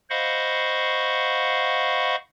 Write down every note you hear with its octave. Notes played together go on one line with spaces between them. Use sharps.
C5 D#5 F5 F#5 B5 C#6